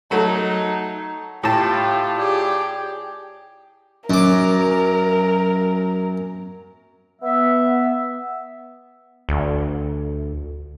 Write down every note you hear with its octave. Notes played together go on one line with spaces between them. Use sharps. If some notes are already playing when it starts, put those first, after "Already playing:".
F#3 A3 D#4
A2 F4 G4 G5 A5
G4 G#4 D5
F#2 A#4 D6
B3 E5
D2